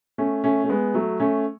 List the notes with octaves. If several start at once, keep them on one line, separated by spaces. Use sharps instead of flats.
A3 C#4
A3 C#4
A3
G#3 B3
F#3 A3
A3 C#4